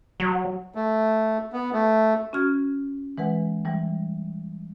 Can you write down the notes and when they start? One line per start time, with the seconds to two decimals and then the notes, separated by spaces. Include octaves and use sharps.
0.20 F#3
0.75 A3
1.53 B3
1.73 A3
2.33 C#4 F#4 F6 G#6
3.18 E3 G#3 B4 F#5
3.65 E3 G3